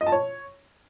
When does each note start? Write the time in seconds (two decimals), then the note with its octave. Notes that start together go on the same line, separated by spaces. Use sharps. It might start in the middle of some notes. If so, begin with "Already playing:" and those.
0.01 D#5
0.07 A5
0.12 C#5